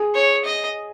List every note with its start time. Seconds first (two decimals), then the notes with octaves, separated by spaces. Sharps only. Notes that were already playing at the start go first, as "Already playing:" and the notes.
Already playing: G#4
0.15 C#5
0.45 D#5